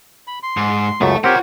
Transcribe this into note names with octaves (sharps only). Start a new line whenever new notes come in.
B5
C6
G#2
C#2 F#2 A3 A4
C4 F4 G4 A#4 C5 C#5 F#5